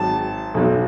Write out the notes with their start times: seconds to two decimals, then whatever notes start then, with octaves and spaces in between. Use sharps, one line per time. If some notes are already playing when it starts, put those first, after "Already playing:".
Already playing: G#1 G#2 F#3 A5
0.54 B1 B2 F#3